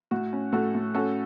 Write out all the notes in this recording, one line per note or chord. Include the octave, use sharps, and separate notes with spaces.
A2 F#4
C#4
A2 F#4 A4
A2
C#4 F#4 A4